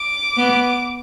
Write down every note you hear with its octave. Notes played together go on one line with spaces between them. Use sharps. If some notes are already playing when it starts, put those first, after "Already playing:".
Already playing: D6
B3